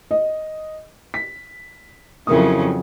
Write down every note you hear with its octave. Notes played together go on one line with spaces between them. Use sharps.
D#5
B6
F2 C#3 F#3 E4 A#4 D#6